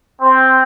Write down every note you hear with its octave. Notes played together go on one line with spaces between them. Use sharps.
C4